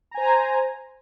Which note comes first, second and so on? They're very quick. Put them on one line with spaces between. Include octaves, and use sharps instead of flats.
A#5 G#5 C5